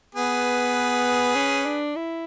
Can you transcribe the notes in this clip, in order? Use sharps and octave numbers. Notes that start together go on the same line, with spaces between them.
B3 G#4 B4
C#4
D4
E4